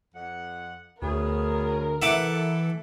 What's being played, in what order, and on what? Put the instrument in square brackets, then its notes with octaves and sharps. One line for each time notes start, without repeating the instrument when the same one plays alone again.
[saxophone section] F2 F#5
[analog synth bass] D2 [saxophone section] B3 C#4 G#4 [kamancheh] A#4
[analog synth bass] E3 [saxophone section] A4 [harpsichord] E5 F#5 D6